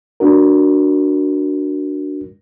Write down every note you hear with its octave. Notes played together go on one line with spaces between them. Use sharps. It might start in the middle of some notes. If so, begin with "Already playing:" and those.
D4 F#4 A#4